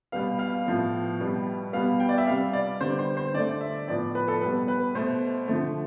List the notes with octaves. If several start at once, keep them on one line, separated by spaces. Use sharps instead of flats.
B2 G3 B3 F5
F5
A2 F3 B3
B2 G3 B3
B2 G3 B3 F5
G5
D5
E5
C3 G3 B3 F5
D5
D3 G3 B3 C5
C5
C5
D3 A3 D5
E5
A2 F3 B3 D5
B4
A4
B2 G3 B3 B4
B4
B2 A3 C5
D3 F3 A3